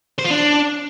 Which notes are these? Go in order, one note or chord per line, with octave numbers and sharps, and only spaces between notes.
C5
F4
D4